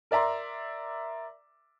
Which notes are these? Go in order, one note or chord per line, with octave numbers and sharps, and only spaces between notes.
A#4 D5 E5 A#5 C6